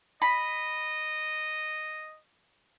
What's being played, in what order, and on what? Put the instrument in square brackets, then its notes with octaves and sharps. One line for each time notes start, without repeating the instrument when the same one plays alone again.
[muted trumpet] D#5 [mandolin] B5